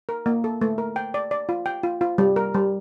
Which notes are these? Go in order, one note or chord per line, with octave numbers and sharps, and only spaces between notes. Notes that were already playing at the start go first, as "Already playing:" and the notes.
A#4
A#3
A4
A3
A#4
G5
D5
D5
F4
G5
F4
F4
G3
A#4
G3